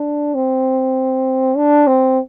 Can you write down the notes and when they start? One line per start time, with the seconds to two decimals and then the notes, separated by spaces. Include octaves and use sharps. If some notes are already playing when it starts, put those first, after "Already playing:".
Already playing: D4
0.35 C4
1.57 D4
1.87 C4